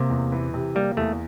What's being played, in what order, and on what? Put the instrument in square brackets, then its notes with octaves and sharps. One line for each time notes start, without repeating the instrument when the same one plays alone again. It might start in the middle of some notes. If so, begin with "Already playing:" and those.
Already playing: [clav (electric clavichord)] C3 [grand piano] A#3
[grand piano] E2
E3
C3
[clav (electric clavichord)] G3 [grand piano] A#3
[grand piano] E2 [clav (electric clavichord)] A3